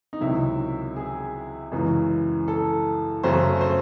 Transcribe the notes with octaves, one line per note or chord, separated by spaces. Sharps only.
D#4
C#2 C3 D#3 F#3 E4
G#4
F#2 C#3 E3 G#3
A4
F#2 C#3 F#3 A3 C5
C5